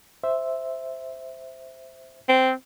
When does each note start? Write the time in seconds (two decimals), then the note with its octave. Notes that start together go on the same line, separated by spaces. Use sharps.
0.24 C5 E5
2.29 C4